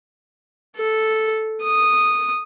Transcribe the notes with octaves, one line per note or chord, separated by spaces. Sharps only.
A4
D#6